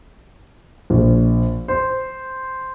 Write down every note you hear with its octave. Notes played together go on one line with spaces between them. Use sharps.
A#1
C5